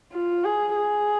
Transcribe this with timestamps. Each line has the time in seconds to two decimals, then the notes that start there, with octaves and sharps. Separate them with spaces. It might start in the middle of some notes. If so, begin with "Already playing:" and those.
0.13 F4
0.44 G#4
0.76 G#4